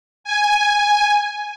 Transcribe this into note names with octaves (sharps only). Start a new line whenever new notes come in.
G#5